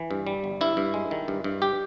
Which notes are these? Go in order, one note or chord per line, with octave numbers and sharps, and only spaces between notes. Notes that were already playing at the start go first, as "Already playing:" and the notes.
Already playing: E3
G2
G3
G1
G2 E4
G2
G#3
D#3
G2
G2
G4